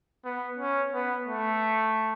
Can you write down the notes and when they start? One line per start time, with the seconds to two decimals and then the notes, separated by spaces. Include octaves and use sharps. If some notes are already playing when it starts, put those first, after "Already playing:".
0.24 B3
0.59 C#4
0.92 B3
1.26 A3